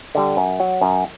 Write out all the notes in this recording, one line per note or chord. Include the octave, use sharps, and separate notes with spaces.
D3 G3
F#2
F#3
F#2